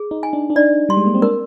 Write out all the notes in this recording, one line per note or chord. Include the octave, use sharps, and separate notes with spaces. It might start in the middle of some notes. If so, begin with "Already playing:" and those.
Already playing: G#4
D#4
G#5
D4
D4
D#4 D5
G3 C6
G#3
A#3
C4
D4 A#4